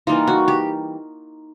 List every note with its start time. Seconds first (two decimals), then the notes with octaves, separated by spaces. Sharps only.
0.07 E3 G3 A#3 D#4 F4
0.27 F#4
0.48 G4